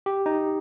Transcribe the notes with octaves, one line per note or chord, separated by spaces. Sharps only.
G4
D#4